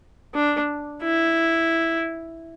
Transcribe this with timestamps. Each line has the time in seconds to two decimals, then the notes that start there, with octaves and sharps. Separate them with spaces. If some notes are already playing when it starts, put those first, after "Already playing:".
0.35 D4
1.03 E4